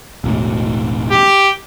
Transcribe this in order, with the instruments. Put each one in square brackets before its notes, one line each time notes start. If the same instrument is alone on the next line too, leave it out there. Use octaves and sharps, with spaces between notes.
[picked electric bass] E1 A1
[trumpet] G4